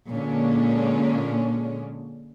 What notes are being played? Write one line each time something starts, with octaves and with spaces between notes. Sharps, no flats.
A#2 D3 G#3 C#4 D4